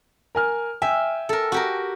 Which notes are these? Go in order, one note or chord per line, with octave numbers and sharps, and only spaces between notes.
A#4 G#5 F6
E5 G5 G#5
A4 A#4
F#4 G4 A#4